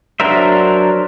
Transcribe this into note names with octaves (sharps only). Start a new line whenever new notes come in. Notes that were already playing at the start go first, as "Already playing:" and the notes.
F#3 D4 A#4 C5 E5